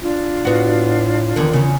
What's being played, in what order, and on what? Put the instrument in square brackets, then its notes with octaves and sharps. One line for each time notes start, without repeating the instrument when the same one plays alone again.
[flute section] D4 F4
[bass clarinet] A2 [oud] B3 F#4
[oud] E2 D3 [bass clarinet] D#3
[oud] E2 C#3